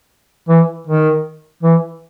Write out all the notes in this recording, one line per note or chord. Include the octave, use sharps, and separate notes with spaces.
E3
D#3
E3